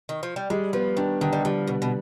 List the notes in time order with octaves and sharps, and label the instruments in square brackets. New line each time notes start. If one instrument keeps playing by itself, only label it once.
[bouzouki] D#3
F3
G3
[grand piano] G3 [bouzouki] G#3
[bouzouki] F3 [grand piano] B3
[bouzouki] D#3 [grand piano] D4
[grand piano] D3 [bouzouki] D#3
[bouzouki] G3
[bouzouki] F3 [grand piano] G3
[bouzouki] B2 [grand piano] B3
[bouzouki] B2